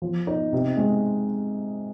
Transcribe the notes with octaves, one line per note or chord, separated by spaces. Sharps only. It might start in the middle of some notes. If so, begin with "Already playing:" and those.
F3
D#4
C3
G#3